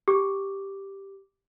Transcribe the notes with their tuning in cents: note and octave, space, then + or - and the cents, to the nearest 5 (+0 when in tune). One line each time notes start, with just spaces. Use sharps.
G4 +0 D6 +0